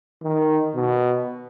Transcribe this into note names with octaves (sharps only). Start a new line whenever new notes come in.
D#3
B2